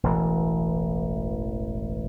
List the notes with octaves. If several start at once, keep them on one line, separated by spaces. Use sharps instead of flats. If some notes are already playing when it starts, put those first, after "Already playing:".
E1 A1 E3